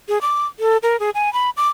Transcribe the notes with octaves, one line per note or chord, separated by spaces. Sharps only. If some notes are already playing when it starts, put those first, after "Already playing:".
G#4
D6
A4
A#4
G#4
G#5
B5
D6